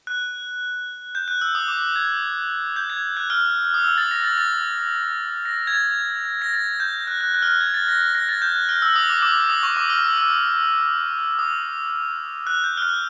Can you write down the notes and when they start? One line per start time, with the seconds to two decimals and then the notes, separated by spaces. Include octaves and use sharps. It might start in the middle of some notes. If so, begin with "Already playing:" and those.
0.07 F#6
1.15 G6
1.28 F#6
1.41 E6
1.55 D#6
1.68 D6
1.96 G#6
2.76 G6
2.90 G#6
3.17 F#6
3.30 F6
3.74 D#6
3.84 E6
3.98 A6
4.11 A#6
4.24 A6
4.38 A6
5.45 A#6
5.67 G#6
5.73 A6
6.42 A#6
6.53 A6
6.80 G6
7.01 G6
7.07 F#6
7.21 F#6
7.34 F#6
7.42 F6
7.48 F#6
7.61 G#6
7.74 A6
7.88 A#6
8.15 A#6
8.29 A6
8.42 G6
8.55 F#6
8.69 F6
8.82 E6
8.96 D#6
9.10 D6
9.22 D6
9.36 D#6
9.49 D#6
9.63 C#6
9.77 D6
9.90 F6
10.04 E6
10.17 E6
11.39 D#6
12.47 F#6
12.64 G6
12.77 F6
12.82 F#6